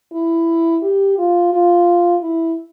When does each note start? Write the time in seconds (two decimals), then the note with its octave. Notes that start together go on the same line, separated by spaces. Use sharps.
0.13 E4
0.83 G4
1.18 F4
1.53 F4
2.21 E4